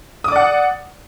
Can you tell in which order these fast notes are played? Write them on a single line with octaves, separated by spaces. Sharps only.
D#6 D6 D5 F#5